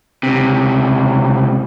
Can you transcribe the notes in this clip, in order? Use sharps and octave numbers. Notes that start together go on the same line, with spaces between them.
C#2 C3